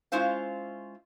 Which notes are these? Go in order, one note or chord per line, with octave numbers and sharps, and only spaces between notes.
G#3 C#4 E4 F4 C5 F5